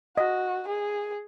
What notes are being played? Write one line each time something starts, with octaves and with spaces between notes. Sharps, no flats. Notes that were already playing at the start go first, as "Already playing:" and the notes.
F#4 D#5
G#4